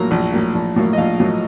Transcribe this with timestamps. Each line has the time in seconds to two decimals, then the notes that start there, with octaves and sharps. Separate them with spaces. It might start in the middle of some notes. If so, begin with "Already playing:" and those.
Already playing: A#1 A2 F#3 A#3 A#5
0.11 A#1
0.32 A2 F#3 A#3
0.54 A#1
0.76 A2 F#3 A#3
0.93 D#5
0.98 A#1 F5
1.20 A2 F#3 A#3